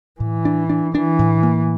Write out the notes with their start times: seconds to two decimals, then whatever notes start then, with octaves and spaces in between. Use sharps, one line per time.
0.20 A2 E3
0.45 D4
0.70 D4
0.94 E3 D4
1.19 A2
1.43 A#3